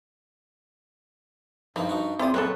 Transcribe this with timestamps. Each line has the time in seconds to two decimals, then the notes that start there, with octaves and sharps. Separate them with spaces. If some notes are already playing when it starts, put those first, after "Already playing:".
1.76 G2 E3 F3 D#4 A#4
1.89 D#4 F#4
2.19 C4 E4 F4 G#4 C5 D5 D#6
2.34 A#2 F#3 A#3 C4 C#4 A4 B4 F#6